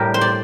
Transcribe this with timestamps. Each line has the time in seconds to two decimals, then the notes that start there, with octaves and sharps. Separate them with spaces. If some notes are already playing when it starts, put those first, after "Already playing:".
Already playing: A2 G3 G4 A#4
0.14 C5
0.21 D5